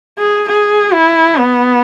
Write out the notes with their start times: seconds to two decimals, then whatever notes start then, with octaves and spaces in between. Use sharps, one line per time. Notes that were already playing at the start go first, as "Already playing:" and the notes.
0.18 G#4
0.48 G#4
0.93 E4
1.38 B3